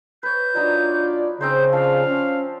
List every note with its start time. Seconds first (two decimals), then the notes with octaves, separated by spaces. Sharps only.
0.23 B4 C#5 G6
0.56 F#3 D4 D#4 F4 D5
1.41 C#3 C4 D#4 C5 G6
1.73 F3 D4 F5
2.07 C#4